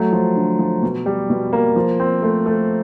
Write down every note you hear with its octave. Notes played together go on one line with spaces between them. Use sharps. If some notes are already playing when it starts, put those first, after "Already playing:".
Already playing: F#3 A3
F3
D3
F3
B2
G3
B2
A#3
F3
C4
A3
A3